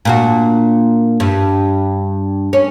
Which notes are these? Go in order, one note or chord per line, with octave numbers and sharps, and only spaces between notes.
A#2 D4 F#4
G2
C#4